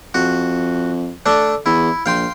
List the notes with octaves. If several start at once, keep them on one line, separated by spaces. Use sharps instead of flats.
F2 F#4
A3 D4
E2 E4
A#1 F5 G5 C6